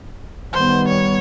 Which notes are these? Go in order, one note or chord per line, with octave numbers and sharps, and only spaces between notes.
D#3 G3 B3 C5
C#5